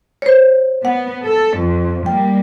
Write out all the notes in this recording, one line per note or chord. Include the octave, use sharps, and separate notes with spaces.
C5 C#5
B3 F#5
A4
F2
G3 A#3 G5